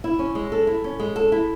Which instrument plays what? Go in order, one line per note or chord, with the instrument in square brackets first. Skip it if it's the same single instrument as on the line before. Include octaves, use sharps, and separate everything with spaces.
[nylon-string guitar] E4
C#4
G#3
A4
E4
C#4
G#3
A4
E4